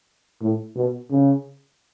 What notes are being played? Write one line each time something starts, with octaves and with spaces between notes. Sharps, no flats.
A2
B2
C#3